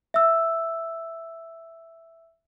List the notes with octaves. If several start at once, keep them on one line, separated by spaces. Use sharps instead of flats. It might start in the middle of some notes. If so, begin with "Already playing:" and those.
E5 E6